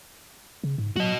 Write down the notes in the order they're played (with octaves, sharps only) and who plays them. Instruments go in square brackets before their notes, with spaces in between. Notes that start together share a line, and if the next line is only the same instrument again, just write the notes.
[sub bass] C#3
G#2
[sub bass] F#3 [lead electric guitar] F#4 D#5